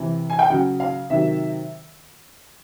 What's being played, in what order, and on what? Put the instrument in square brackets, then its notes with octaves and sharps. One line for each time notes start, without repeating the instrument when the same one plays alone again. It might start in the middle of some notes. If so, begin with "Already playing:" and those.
Already playing: [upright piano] C3 E3
G#5
G5
C#3 F#3 F#5
F5
C3 D#3 F#3 E5